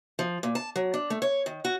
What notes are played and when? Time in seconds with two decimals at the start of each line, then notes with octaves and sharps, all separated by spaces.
0.19 F3
0.43 A#2
0.55 A5
0.76 F#3
0.94 D4
1.10 A3
1.22 C#5
1.46 D#3
1.65 F#4